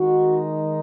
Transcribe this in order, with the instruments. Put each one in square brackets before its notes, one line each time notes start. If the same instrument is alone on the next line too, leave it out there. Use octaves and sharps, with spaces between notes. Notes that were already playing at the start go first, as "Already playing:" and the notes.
Already playing: [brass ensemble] D#3 G#3 D#4 F#4